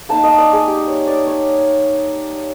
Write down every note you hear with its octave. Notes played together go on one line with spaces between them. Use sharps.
A#3 D#4 A5
D#5
D5
G#4
G4
C#5
D5
C#5